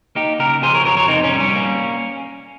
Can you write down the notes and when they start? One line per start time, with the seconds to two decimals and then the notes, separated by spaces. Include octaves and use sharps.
0.15 A#3 D#4 G4
0.39 C#3 G4 A#4
0.63 F3 G#4 C5
0.74 A#4 C#5
0.85 F2 A#4 C#5
0.97 A#4 C#5
1.08 C3 C4 D#4
1.24 C#4
1.33 G3
1.40 C#4
1.55 A#3